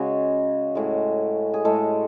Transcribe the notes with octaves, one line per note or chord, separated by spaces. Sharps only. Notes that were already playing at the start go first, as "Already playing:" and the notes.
Already playing: C#3 G#3 F#4
A2 G#3
G#4
A2 G#3 A4